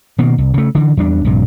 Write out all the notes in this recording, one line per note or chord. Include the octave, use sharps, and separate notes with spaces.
B2 D#3 A#3
C2
C#3 A3
D3 E3
E2 G3 D4
A#1 G2 C3